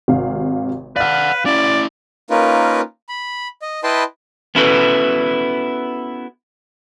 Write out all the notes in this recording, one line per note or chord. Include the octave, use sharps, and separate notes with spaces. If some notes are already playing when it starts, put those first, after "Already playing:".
G#1 C3 F5
B4 D5 F5 F#5 F6
C#4 E4 D5
A#3 C#4 D#4 F4 A#4 B4
B5
D#5
E4 B4 D#5 G5 A5 C6
B3 C#4 E4 F#4 A4 B4